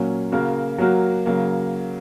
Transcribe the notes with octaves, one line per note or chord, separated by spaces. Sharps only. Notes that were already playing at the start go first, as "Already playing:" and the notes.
Already playing: A#2 F#3 A#3 C#4
C#3 A#3 F#4 A#4
F#3 A#3 F#4 A#4
C#3 F#3 A#3